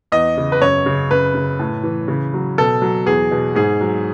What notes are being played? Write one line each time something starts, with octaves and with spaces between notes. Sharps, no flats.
E2 D#5
C#3
B4
F#2 C#5
C#3
F#2 B4
C#3
A2
E3
C#3
F#3
B2 A4
F#3
E2 G#4
B2
G#2 G#4
F#3